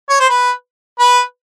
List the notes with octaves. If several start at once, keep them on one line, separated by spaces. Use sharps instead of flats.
C#5
C5
B4
B4